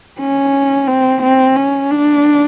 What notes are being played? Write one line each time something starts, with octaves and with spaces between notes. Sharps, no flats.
C#4
C4
C4
C#4
D4